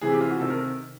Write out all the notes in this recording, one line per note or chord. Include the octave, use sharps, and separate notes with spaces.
C3 E3 G#4
G4
F4
F#4
C3 D#3 A4
A#4